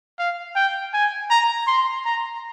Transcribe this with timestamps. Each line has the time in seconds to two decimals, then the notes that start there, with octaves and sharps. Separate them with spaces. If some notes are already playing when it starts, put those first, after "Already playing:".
0.19 F5
0.56 G5
0.94 G#5
1.31 A#5
1.67 C6
2.05 A#5